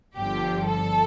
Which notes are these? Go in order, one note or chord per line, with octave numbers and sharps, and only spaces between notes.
G1 G2 D3 F3 G4
A4